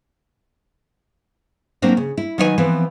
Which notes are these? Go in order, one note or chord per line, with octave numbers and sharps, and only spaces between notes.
F#3 A#3 C4 D4
C#3
E4
D#3 F#3 D#4 B4 C#5 G#5
E3 F3 B3 C4